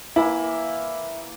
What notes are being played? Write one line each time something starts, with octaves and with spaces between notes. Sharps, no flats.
E3 A#3 E4